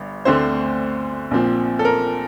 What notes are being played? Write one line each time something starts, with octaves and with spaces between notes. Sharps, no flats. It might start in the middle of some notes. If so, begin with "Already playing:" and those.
Already playing: G1 G2
D2 D3 A3 C4 C5
A#1 A#2 F3 C4
A4
A#4